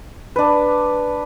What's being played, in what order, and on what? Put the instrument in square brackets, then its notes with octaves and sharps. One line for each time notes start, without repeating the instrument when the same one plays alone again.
[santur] D4 B4